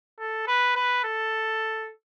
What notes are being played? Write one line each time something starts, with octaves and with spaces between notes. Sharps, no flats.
A4
B4
B4
A4